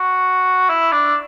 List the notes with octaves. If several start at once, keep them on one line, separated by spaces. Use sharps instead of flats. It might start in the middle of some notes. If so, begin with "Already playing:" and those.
Already playing: F#4
E4
D4